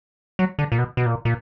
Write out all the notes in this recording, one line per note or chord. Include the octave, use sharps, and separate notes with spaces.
F#3
D3
A#2
B2
B2
A#2
A#2